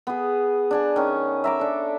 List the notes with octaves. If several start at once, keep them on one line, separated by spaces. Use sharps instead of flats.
B3 G#4
D4 G#5 A5
D#3 C#4
E5 A#5 D6
D4 A4